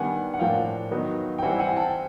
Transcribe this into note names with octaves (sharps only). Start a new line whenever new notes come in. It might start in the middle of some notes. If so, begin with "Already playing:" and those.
Already playing: D#3 G3 B3 D4 F#5 G#5
F#5
A2 F3 A#3 D4 F5 G5
D#3 F#3 B3 D#4
G5
E3 G3 C4 E4 F#5 G#5
F#5 G#5
G5 A5